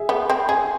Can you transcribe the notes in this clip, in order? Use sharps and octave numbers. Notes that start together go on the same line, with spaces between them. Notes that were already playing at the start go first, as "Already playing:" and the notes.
Already playing: G#4 E5
B3
C4
G#4 G#5